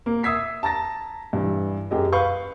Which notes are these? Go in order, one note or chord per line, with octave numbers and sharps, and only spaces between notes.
A#3
E5 D#6 E6 G#6 B6 C7
A5 A#5 A6 A#6
G2 E3
F#2 G4 G#4 D#5
B4 F5 B5 C#6 G6